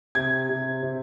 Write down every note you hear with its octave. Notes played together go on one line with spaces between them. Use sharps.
C3 G#6
C3
C3